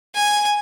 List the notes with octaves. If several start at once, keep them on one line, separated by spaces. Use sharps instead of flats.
G#5